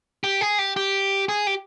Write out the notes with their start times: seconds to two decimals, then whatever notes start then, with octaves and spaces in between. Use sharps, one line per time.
0.24 G4
0.41 G#4
0.59 G4
0.77 G4
1.29 G#4
1.47 G4